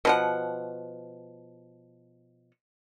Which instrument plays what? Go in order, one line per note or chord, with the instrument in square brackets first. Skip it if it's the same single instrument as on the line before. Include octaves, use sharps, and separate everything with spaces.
[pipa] B2 F3 F#5